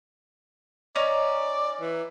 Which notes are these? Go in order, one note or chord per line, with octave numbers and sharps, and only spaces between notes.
C#4 D#4 D5
E3